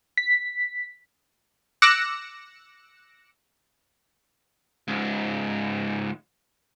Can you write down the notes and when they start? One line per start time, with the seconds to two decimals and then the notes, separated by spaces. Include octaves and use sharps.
0.17 B6
1.82 D6 E6 F#6 A#6 C#7 E7
4.88 C#2 G#2